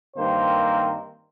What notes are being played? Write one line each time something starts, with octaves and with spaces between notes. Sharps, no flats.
G2 D#3 A#3 C4 A#4 C5